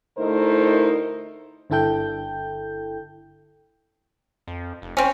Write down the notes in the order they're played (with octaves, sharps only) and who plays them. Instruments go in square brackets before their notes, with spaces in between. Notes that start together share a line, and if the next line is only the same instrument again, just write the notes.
[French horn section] D2 A3 D#4 E4 A#4 C5
[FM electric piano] G1 D3 E4 A4 G5 G6
[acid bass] F2
F1
[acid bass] E1 [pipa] C4 C#4